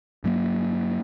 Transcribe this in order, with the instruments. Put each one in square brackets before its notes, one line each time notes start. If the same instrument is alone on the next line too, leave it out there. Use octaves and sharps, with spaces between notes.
[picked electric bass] G2 F#3 A#3